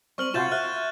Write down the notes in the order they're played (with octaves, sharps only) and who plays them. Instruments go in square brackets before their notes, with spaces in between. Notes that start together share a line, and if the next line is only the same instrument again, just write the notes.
[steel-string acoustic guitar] G3 C4 [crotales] C#6 F6 F#7
[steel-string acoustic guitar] C3 [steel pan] F4 F#4 [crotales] G6 A6 E7
[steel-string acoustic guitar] E5 [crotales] F6 F#6